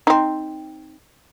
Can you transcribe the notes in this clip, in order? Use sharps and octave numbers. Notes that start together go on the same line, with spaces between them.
C4 D#4